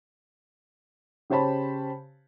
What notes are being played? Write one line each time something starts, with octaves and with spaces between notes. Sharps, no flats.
C#3 G4 C5 C#5 A5 B5